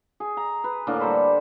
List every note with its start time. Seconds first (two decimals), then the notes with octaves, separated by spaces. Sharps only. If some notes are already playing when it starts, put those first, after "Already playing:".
0.20 G#4
0.37 A#5
0.64 B4
0.87 A2 D3 A#3 A#4
1.00 G3 A4 C5 B5